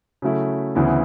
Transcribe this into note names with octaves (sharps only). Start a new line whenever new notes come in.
C#3 F#3 A3 E4
D2 C#3 E3 B3 E4